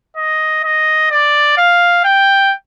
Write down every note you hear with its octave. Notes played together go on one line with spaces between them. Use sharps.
D#5
D#5
D5
F5
G5